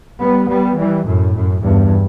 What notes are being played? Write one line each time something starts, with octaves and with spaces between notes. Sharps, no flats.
G3 B3
G3 B3
E3 G3
F#2 A2
F#2
E2 G2